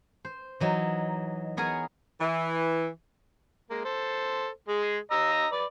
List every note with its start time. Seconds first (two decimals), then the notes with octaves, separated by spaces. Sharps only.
0.25 C5
0.60 E3 F#3 D#4
1.57 B3 G#4 A#4 C#5 G#5
2.20 E3
3.70 G#3 A#3
3.85 A4 C5
4.69 G#3 G#4
5.11 D#5 A#5 E6
5.52 B4 D5